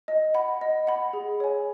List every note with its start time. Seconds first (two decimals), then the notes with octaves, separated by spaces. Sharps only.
0.08 D#5
0.34 F#5 B5
0.61 D#5
0.87 F#5 B5
1.13 G#4
1.40 C#5 G#5